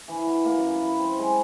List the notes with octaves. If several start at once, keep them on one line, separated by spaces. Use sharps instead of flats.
E3
F#5
A#3
F#2
E4
B4
C4
G#3